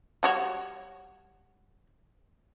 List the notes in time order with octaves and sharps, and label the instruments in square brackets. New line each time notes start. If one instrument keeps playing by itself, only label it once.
[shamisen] G3 F#4 C#5